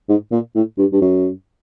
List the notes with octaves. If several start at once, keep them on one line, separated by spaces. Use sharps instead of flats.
G#2
A#2
A2
G2
G2
F#2